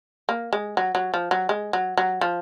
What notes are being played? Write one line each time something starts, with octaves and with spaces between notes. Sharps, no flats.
A#3
G#3
F#3
F#3
F3
F#3
G#3
F#3
F#3
F3